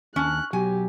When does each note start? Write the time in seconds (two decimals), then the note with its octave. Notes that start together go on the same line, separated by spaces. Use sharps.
0.16 D#2 C#4 A5 F#6
0.53 B1 F#3 G4 G#5